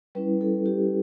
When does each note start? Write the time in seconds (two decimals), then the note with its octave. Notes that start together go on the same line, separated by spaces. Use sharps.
0.15 G3 C#4 E4 B4
0.41 A4
0.66 G4